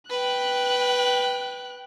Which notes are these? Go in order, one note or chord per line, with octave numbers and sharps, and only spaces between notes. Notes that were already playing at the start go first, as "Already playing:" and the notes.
B4 G5 F#6